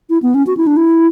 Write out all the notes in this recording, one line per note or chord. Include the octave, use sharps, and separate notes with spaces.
E4
B3
C#4
F#4
E4
D4
E4